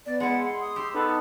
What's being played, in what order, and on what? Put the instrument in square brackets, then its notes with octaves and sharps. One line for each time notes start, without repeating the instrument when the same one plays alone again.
[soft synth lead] B3 [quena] D5
[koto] G#3 E4 [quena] F#5
[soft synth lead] C6
[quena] D#6
[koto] G4 [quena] C6 [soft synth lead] E6
[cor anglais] B3 [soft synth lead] D#4 [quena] A4